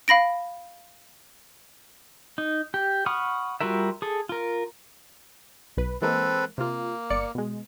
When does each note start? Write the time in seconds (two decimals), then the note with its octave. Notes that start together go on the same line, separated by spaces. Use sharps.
0.08 F5 B5 A#6 D7
2.38 D#4
2.74 G4
3.06 F#5 B5 C#6 D#6 F6
3.61 G3 F4 F#4 A#4 E5
4.02 G#4 A4
4.29 F4 A#4
5.77 B1 B4
6.02 E3 G#3 A#3 C4 A4 B4
6.58 C3 A#3 F4
7.10 G1 D5 C#7
7.35 B2 G#3